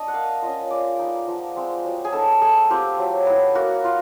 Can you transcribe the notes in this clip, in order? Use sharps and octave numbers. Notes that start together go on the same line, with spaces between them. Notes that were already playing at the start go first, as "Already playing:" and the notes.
Already playing: D4 D#5
F#5
A#3 F5
C#4 F4 D#5
G#3 D5
B3 D#4
F3
G#3 C4
F#3
G#4
B3 D#4 A4
A3 G#4
C4 F4 G4
F#3
B3 E4
A#3 F#4
F4